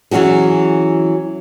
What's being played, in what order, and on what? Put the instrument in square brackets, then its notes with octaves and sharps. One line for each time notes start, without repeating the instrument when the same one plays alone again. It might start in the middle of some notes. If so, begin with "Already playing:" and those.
[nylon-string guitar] E3 F#3 C#4 F#4 G#4